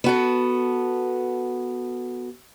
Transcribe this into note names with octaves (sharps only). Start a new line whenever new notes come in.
B3 F#4 A4